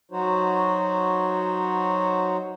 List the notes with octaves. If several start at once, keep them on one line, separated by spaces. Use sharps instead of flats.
F#3 D#4 F#4 C5 C#5